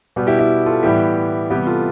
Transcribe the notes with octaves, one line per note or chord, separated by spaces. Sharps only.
B2 G3 B3
E4 G4
E4 G4
F4 A4
A2 E3 G3 B3 E4 G4
C3 E3 G3 B3 E4 G4
F4 A4